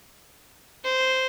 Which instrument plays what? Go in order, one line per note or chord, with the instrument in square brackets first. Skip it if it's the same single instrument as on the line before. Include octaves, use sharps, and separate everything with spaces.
[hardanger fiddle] C5